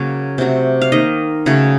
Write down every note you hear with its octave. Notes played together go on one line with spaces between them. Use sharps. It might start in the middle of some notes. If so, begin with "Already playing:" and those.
Already playing: C#3 F#3 A#3 C#5
C3 F#3 A3
F5
D#3 A#3 D#5
C#3 F#3 A3